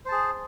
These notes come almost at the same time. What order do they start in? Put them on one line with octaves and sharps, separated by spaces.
C5 A5 G#4